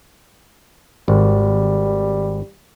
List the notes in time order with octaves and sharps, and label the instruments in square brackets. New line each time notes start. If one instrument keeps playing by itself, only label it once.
[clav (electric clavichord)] G#1 [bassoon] G3